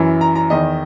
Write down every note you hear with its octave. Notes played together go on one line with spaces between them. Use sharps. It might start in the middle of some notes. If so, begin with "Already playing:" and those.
Already playing: F#2 E3
A#5
A#5
E2 D#3 D#5